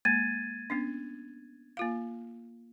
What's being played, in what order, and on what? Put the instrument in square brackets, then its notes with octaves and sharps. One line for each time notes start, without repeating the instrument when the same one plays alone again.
[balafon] G#3 A#3 [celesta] G#6 A6 D#7
[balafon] B3 C#4 D4
A#3 F4 F5